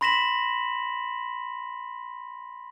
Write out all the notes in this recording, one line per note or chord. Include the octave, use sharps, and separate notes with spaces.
B5 C6 A#6 B6 E7 F#7